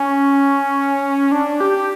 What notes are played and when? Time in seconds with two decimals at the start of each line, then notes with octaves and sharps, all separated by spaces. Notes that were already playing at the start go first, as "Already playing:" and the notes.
Already playing: C#4
1.32 D4
1.60 G4